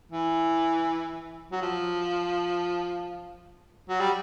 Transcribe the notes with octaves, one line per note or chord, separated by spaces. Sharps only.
E3
F#3
F3
F#3
G3